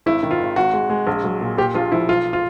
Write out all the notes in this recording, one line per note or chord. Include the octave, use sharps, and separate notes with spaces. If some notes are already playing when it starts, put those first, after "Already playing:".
G#1 E4
D#3
F4
G#1
G#1 F#4
G#3
G#3
A#1
F#3
A#2
A#2 G4
A#1 F4
F3 E4
B1 F4
F4